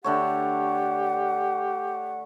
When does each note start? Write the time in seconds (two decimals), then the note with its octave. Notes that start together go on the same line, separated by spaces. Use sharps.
0.04 D3 A3 G4 C#5 F#5